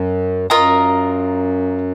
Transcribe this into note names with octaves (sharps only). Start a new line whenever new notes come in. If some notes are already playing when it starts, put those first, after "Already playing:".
Already playing: F#2
F#2 F4 A#4 D#5 A#5